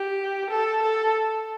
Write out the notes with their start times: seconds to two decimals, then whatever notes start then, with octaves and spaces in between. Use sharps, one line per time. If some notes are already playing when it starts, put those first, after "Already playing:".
Already playing: G4
0.50 A4
0.82 A4